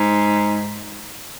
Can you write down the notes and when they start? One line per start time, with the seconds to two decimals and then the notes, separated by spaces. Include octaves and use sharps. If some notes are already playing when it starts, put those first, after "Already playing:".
Already playing: G#2